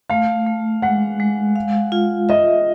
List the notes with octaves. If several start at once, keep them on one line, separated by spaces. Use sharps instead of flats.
A3 F5
A3
G#3 F#5
G#3
F5
F4
D#5 E5